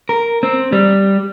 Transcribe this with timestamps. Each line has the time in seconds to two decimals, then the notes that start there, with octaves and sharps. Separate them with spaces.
0.09 A#4
0.43 C4
0.72 G3